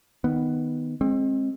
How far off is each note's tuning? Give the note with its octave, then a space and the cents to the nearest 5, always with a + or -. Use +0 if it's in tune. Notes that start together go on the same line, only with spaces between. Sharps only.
D#3 +0 B3 +0
G#3 +0 C4 +30